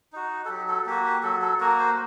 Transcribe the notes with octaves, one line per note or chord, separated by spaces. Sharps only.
D#4 F#4
A4
F#3 G4
A4
A#3 F#4 G4
G4
F#3 A4
A4
A#3 F#4 A#4
C5